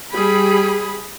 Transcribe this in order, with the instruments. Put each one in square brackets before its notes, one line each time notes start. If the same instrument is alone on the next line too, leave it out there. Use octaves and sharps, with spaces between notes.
[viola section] G3 G#4 B5